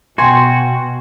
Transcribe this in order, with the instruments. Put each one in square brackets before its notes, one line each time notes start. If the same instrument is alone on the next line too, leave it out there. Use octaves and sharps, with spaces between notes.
[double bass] B2 [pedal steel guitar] F#4 [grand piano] G5 C6 [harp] G#5